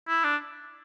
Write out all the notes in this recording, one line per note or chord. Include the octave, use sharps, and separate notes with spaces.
E4
D4